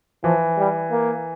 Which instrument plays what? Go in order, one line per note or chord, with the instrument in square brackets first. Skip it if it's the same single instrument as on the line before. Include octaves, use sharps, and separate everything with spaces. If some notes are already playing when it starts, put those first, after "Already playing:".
[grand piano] E3 [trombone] F3
[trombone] G3
A#3